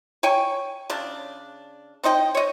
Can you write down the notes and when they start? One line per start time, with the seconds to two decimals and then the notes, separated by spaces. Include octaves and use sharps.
0.23 C#5 G5 G#5 C#6
0.90 C#3 D4
2.04 C4 D#4 D#5 G5
2.35 C#5 D#5